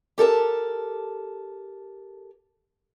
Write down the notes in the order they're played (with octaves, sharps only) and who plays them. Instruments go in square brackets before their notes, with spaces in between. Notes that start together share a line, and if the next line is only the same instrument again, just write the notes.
[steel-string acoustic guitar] G4 A4 A#4 A5